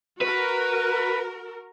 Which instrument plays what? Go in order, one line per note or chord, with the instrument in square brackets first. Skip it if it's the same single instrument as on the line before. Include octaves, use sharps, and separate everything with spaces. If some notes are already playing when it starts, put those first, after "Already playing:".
[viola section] F#4 A#4 [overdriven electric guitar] B4